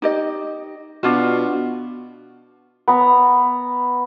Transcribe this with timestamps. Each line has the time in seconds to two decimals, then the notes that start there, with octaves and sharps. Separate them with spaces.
0.02 D#4 G4 D#5
1.03 B2 D4 F4 F#4
2.88 B3 A#5